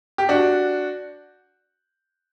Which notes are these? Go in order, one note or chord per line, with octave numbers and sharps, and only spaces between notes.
G4
D4 F#4